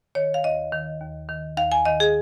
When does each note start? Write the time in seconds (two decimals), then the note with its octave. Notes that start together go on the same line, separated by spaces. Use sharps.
0.15 D#3 C#5
0.34 F5
0.44 D#2 D#5
0.73 D#3
1.01 D#2
1.29 D#3
1.57 D#2 F5
1.72 G#5
1.85 D#3 D#5
2.00 G#4